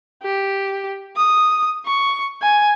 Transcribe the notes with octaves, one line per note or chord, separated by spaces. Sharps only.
G4
D#6
C#6
G#5